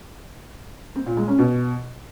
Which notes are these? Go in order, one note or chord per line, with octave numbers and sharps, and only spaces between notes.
C4
A#2
G#3
C#4
B2